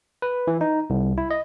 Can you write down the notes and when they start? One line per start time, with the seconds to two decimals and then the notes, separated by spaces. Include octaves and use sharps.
0.22 B4
0.47 E3
0.61 D#4
0.90 C2
1.18 E4
1.31 D#5